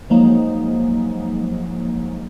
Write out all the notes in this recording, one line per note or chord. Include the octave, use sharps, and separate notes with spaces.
F3 F#3 G#3 A#3 D#4